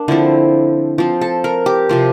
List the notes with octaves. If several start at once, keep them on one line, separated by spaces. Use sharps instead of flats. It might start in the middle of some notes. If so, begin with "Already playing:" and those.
Already playing: A#3 D4
D3 F3 C4 E4
F3 C4
A4
A#4
G4
C3 F3 C4